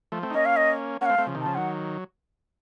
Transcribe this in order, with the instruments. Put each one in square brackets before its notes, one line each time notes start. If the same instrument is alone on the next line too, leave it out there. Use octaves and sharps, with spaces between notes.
[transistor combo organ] F3 A3
A3 C4
D#4
[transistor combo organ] A#3 C#4 [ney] D#5
[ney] F5
D#5
[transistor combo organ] A#3 C#4 [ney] F#5
[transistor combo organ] A3 C4 [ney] F5
[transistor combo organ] A3 C4
C#3 F3
C3 D#3
[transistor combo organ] C#3 F3 [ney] A5
[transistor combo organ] D#3 F#3 [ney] F#5